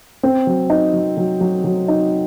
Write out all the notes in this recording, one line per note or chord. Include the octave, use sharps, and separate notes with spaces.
C4
F#3
D#4
F#3
F#3
F#3
F#3
D#4